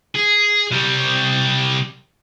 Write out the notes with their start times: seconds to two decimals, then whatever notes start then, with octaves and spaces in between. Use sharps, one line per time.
0.15 G#4
0.72 C3 G3